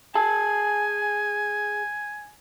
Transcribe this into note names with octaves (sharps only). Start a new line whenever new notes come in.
G#4 G#5 A5